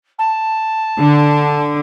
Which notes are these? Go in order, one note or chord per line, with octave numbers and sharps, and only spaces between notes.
A5
D3